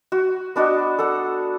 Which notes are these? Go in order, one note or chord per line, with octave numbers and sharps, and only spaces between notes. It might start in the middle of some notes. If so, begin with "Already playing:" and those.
F#4
B3 D4 F#4 D#5
A4 F#5